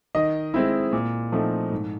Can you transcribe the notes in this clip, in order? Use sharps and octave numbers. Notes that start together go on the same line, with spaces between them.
D#3 D#5
G#3 C4 E4
A#2
F3 A3 C4 D#4
G#2